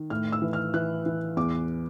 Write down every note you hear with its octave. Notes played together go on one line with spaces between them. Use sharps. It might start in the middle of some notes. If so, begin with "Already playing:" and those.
Already playing: D#3
A2 F6
E6
E3
F6
E3 F#6
E3
E2 D6